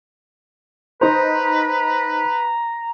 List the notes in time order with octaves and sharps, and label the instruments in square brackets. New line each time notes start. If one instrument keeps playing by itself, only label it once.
[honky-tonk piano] D#4 C5 [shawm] B4 [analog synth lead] A#5